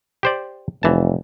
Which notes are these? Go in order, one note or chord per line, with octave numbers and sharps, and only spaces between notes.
G4 C5 D5
F1 E3 A5